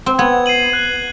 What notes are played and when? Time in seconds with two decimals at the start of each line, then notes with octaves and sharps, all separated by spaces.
0.06 C4
0.19 B3 G#6
0.46 C7 D#7 F#7
0.73 F#6